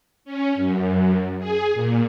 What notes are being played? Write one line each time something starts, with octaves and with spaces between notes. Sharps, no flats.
C#4
F#2
G#4
A#2